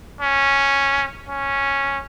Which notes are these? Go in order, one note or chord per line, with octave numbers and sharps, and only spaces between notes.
C#4
C#4